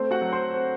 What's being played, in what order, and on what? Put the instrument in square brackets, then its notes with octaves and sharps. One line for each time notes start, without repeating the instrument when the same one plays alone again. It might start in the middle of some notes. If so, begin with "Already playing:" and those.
Already playing: [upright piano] A3 C4 C5
F#4 F#5
F#3
C5 C6
C4